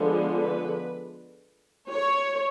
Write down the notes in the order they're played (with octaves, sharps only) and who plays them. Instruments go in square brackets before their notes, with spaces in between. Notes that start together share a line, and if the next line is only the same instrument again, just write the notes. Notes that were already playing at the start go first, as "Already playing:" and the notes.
Already playing: [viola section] D3 F3 G#3 B3
B4
C#5